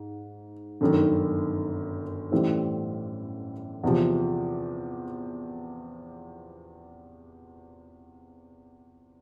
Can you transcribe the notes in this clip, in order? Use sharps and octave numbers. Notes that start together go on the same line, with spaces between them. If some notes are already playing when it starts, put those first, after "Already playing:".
Already playing: G#2
G1 F#2 D#3
A1 A2 E3 G3 C4
E2 C3 F3